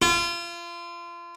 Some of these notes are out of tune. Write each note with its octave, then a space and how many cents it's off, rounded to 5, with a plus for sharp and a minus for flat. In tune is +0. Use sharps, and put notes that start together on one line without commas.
F4 -30